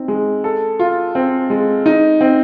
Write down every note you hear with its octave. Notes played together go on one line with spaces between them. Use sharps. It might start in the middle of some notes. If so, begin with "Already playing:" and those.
Already playing: C4 D#4
G#3
A4
F4
C4
G#3
D#4
C4